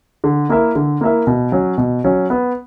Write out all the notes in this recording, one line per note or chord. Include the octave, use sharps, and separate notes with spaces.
D3
A#3 E4 A#4 E5
D3
A#3 E4 A#4 E5
B2
F#3 C#4
B2
F#3 C#4
B3